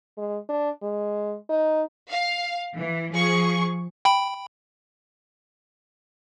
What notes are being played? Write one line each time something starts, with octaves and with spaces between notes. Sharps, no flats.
G#3
D4
G#3
D#4
F5
E3
F3 G#4 C#6
G5 B5